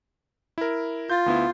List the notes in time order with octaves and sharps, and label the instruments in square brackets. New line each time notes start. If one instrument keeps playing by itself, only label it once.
[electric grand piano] E4 A#4
[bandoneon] F4 [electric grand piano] G6 A6
[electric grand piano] D2 B3 E4